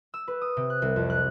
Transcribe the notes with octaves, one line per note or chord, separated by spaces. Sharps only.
E6
B4
D#6
C3
F#6
C2
F2
F#6